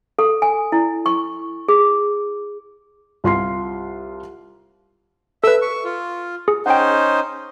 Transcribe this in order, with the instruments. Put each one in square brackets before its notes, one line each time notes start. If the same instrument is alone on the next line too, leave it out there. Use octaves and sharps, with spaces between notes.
[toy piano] A4
G#5
E4
C#6
G#4
[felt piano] C2 F4 C6 C7
[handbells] A4 B4 [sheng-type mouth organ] E5 E6
[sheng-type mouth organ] C#6
F4
[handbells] G#4
[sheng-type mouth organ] C#4 D#4 C5 [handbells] F#5 G5